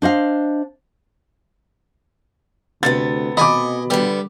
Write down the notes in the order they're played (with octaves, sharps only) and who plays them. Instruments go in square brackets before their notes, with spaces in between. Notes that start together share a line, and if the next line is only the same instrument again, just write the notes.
[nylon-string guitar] D4 C5 D#5 F5
[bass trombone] D2 [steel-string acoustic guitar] C3 A3 B3 [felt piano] A6
[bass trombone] B2 [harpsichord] D#5 G#5 [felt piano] B5 D6
[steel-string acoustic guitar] D3 B3 [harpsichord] G3